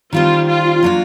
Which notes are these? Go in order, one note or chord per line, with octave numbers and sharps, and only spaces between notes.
D#3 G3 C4 F4
F4
F#3 A#3 D4 F4